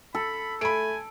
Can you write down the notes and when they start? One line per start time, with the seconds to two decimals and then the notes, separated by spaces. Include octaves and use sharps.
0.15 A4 B5
0.61 A3 G#5 B5 D7